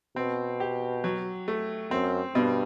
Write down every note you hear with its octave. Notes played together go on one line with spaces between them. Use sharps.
B2 C4
G4
F#3
A3
F#2 C4
G2 B2